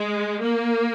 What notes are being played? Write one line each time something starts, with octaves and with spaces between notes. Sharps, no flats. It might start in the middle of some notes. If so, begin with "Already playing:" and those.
Already playing: G#3
A#3